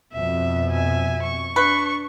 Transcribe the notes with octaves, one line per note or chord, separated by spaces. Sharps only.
F2 B2 E5
E5 G#5
C#6
D4 B4 C#6